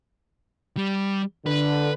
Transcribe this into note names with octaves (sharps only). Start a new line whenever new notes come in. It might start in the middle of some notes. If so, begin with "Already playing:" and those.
G3
D3 B4